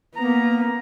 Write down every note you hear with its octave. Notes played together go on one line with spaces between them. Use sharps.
A#3 B3 A#5